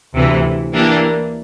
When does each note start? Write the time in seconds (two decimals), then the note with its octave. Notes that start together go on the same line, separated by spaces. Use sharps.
0.14 D2 C3 E3
0.73 E3 A#3 D4 G4 A#4